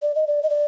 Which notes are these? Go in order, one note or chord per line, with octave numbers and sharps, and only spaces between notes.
D5
D#5
D5
D#5
D5